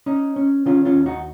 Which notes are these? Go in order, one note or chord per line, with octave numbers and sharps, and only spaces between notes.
C#4 D#4
C#4
D#3 C#4 F4
C#4 F4
D#2
D#4 F#4